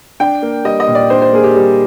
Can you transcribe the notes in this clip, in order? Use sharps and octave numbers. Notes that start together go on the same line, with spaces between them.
D4 G5
A#3
G3 D#5
D#5
A#2
D5
D4 C5
C5
A#3 G#4
G4
G3